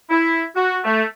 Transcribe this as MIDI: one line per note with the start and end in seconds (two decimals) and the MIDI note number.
0.10 0.43 64
0.56 0.78 66
0.84 1.03 57